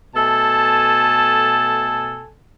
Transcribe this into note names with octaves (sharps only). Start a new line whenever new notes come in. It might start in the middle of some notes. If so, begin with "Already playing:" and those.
B2 A3 A4 G#5 A5